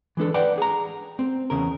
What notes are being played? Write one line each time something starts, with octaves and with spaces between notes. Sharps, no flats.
E3 G#3 D4 A4
B4 D5 F#5 G5
G#4 A#5
C4
E2 C#3 A#4